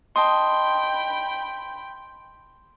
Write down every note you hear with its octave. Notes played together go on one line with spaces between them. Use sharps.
D#5 G5 A5 B5 C6